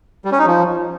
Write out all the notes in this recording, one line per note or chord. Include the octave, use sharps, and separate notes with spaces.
G3
C#4
D#4
F3